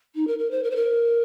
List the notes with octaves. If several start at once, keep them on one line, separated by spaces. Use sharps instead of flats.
D#4
A#4
A#4
C5
A#4
C5
A#4